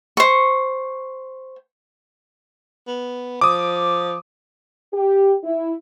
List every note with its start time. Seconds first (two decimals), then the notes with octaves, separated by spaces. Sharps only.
0.17 C5 C#6
2.87 B3
3.41 F3 D6 D#6
4.94 G4
5.44 E4